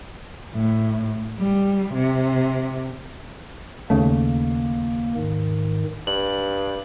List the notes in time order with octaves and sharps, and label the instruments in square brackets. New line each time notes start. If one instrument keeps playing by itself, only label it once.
[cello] A2
G3
C3
[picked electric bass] D#2 C#3 A3 [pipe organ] A#3
[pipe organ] G#2 D#3
[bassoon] G2 [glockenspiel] F#7